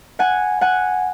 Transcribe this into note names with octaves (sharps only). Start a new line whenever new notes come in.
F#5 G#5
F#5 G#5